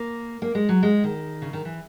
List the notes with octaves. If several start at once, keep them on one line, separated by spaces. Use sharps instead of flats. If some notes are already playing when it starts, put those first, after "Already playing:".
Already playing: A#3
A#3
G#3
F#3
G#3
D#3
C#3
D#3
E3